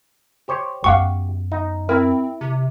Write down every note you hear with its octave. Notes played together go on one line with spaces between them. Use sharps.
G4 C5 C#5
F#2 B3 G4 F5 F#5 C#6
D#4
C4 E4 A#4
C3